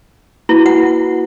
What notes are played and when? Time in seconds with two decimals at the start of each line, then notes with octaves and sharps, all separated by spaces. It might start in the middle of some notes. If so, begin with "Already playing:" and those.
0.49 A#3 E4 F#4 B4
0.66 F#5